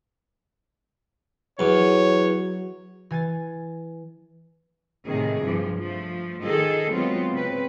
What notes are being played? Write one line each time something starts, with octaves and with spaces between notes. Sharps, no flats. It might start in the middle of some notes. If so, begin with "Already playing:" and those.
E2 F#3 C#5
E3 G#5 G#6 A6
A2 C3 D#3 G#4
G2 F3
F3 A3
D#3 D#4 G#4 A4
F#3 G#3 B3 C4 F4
C#3 C4 B4